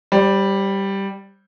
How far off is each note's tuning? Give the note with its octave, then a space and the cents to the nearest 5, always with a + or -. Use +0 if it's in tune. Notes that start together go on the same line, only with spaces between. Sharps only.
G3 +0 C5 +45